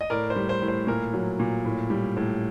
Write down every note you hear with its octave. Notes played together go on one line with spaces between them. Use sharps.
D#5
A2 A#4 D5
C5
G3
C5
A2
C5
A#2 A#4
F#3
A#2
A2
G3
A2